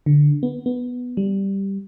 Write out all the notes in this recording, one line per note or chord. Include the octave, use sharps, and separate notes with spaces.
D3
B3
B3
G3